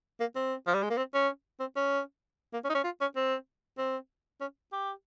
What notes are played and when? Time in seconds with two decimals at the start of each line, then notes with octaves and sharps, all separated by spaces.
0.20 A#3
0.36 C4
0.67 F3
0.74 G3
0.83 G#3
0.90 A#3
0.98 C4
1.14 C#4
1.60 C4
1.76 C#4
2.53 A#3
2.64 C#4
2.70 D#4
2.75 C#4
2.84 F4
3.01 C#4
3.16 C4
3.78 C4
4.41 C#4
4.72 G4